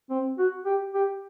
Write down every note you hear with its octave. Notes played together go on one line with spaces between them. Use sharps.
C4
F#4
G4
G4